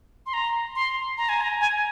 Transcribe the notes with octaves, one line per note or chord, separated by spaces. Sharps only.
C6
A#5
C6
A#5
G#5
A#5
G#5